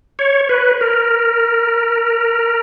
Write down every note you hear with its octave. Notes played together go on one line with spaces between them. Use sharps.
C#5
B4
A#4